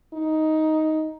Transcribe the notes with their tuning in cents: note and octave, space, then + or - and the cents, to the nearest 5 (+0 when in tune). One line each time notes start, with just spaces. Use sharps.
D#4 +10